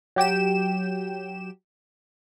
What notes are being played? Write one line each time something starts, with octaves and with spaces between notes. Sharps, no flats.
F#3 G4 G5 E7